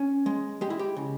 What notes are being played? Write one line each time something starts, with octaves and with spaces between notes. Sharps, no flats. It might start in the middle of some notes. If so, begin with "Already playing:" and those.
Already playing: C#4
G#3
G#3 G4
E4
G4
C#3